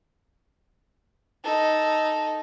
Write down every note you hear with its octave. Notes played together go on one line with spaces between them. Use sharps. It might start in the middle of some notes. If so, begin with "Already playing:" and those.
D#4 A4